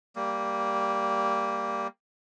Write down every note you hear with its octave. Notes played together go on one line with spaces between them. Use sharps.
G3 A#3